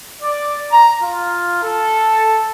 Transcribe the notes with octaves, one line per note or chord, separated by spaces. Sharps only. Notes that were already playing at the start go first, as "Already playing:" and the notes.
D5
A#5
F4
A4